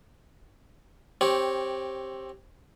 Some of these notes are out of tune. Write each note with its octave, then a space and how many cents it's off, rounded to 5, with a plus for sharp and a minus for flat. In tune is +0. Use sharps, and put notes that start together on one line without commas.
C4 +15 G4 +0 C#5 +0